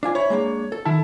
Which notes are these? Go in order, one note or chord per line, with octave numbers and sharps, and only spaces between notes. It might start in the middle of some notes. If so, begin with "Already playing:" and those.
D4 F4 G#5
E4 C#5
G#3 A#3 D4
A4
D#3 E4 A5